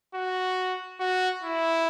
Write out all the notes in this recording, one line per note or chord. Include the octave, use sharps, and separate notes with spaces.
F#4
F#4
E4